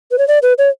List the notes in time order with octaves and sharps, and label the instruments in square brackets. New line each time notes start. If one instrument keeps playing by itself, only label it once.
[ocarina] B4
C#5
D5
B4
C#5